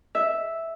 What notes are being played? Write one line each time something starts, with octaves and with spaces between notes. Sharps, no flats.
E5